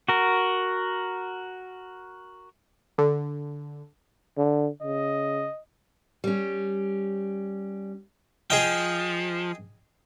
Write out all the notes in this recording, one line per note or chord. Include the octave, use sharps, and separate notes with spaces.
F#4 A#4
D3
D3
C#3 D#5
G3 C#4
F3 G#4 D#5 G5